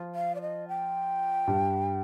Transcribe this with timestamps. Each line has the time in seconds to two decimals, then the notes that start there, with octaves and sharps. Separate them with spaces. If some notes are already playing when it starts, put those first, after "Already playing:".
Already playing: F3 F4
0.15 F5
0.35 D5
0.41 D#5
0.68 G5
1.47 G2 G3